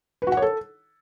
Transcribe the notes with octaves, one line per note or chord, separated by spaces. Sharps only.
B4
F#4
F#5
C#5
A4